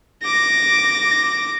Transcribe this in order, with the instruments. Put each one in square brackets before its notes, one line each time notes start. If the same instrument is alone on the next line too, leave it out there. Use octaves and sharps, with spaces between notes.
[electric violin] D6 A#6